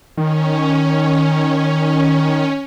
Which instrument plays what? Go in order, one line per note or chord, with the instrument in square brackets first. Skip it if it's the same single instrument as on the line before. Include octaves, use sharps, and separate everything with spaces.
[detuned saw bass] D#3 [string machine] C#4